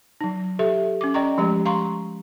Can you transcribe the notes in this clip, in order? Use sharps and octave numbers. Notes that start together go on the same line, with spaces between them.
F#3 D#4
G4 A4 E5
C#4 D6
D5 D#5 G5 A#5 C#6
F3 G#3 A3 G4 A#5
F5 A#5 C6 C#6